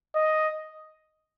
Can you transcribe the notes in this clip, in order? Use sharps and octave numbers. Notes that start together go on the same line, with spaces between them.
D#5